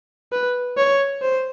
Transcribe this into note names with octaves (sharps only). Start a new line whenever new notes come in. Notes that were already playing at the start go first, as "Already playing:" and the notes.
B4
C#5
C5